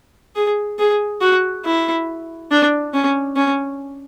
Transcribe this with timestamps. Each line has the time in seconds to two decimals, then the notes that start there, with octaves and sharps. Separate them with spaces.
0.35 G#4
0.79 G#4
1.21 F#4
1.65 E4
2.51 D4
2.93 C#4
3.36 C#4